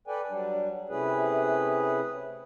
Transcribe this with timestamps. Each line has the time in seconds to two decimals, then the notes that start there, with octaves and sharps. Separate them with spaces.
0.07 A4 B4 D5 G5 G#5
0.29 F#3 G3 D4
0.89 C3 A3 C#4 E4 G#4 B4